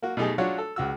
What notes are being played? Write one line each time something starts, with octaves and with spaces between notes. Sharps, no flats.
A#3 F#4
B2 A3 D#4 G4 G#4
F#3 D4 F4 F#4 C#5
A4
C#2 F#4 E6